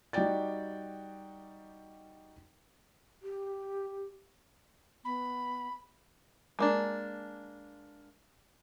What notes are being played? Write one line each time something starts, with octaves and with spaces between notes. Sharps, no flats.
G3 D#4 F#4 D5 G5 A6
G4
B3 B5
G#3 A#3 D4